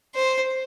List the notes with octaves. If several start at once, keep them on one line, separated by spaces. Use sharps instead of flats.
C5